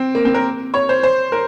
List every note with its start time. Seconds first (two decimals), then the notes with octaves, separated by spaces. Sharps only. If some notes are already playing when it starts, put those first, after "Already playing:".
Already playing: C4
0.15 A#3
0.25 C4
0.34 A#4
0.74 C#5
0.89 C5
1.03 C5
1.32 A#4